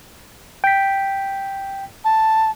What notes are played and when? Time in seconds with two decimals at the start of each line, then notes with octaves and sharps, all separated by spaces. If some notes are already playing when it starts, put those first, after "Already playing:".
0.64 G5 B6
2.04 A5